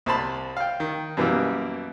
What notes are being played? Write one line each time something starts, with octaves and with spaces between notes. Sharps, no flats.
C2 C5 A5 B5
F5 G5
D#3
F#2 B2 E3 G3 A#3